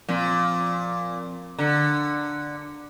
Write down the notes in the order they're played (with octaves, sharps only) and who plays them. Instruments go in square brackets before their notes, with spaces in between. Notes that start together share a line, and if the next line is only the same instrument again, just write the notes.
[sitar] A#2 [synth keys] F3 C4
[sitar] D3 [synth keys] A#5 C#7